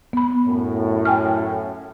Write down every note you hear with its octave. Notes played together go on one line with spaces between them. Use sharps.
B3 B5
F#2 A2
G5 G#5 F6